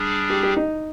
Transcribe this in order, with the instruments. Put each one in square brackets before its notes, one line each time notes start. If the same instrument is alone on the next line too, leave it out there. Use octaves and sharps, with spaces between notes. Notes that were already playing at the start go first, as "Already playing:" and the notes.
Already playing: [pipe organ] G3 D4 G#4
[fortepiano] G4
G4
D#4